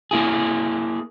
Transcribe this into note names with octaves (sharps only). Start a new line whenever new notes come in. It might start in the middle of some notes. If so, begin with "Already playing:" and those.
A#3 E4 G#4